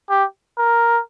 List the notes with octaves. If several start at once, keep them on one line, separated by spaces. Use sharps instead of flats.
G4
A#4